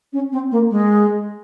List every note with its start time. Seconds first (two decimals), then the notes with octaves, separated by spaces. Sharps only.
0.12 C#4
0.32 C4
0.51 A#3
0.70 G#3